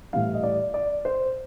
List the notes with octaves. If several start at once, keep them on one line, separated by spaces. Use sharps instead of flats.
A2 E3 G3 F5
D#5
D5
D5
C5